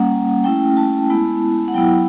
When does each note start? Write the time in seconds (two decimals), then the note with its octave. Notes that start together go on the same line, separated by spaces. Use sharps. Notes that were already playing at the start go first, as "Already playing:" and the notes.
Already playing: G3 A#3 C#4 F#5
0.44 A3 C#4 E4 G5
0.77 A5
1.10 G#3 B3 E4
1.68 F#5
1.74 F#3 B3 E4 G5